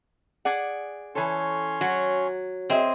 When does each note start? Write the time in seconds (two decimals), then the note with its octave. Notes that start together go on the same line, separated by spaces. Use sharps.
0.45 G#4 D5 F#5
1.15 E3 C#4 A4 C#5 C6
1.81 F#3 F#4
2.70 C4 G#4 D#5 E5